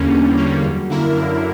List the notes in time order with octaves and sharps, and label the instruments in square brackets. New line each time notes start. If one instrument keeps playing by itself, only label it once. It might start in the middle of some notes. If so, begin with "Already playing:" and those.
Already playing: [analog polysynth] E2 D3 G3 A#3 C#4
E2
D3 G3 A#3 C#4
F#2
D3 A#3 E4 A#4
F#2